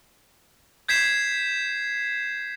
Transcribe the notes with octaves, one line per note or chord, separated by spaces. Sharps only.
G6 G#6 B6 C7 E7